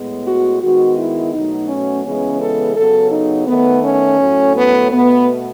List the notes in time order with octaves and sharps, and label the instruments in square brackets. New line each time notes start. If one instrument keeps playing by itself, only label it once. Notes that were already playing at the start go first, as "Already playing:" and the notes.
Already playing: [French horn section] A2 G#3 B3
F#4
D#3 G#3 B3 F#4
E4
B2 F#3 A3 D#4
C#4
C#3 E3 G#3 B3 C#4
A4
C#3 F#3 B3 A4
D#4
D#3 A3 B3
C#4
A2 F#3 A3
B3
B2 A3 B3